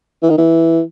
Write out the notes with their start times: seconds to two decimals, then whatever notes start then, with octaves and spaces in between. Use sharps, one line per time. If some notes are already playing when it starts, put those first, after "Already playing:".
0.23 E3
0.30 D#3
0.38 E3